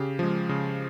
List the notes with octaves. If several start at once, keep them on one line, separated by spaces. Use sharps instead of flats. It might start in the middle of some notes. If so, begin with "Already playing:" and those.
Already playing: C#3 G4
F3 G#3
C#3